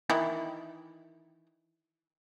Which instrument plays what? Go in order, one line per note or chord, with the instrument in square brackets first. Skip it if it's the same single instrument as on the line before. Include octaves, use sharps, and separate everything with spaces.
[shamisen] D#3 E3 E4